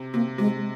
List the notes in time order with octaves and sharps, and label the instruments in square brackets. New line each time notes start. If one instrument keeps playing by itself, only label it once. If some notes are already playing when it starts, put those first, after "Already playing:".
Already playing: [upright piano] C3
[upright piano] C3 [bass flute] A#3
[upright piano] C3 [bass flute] G#3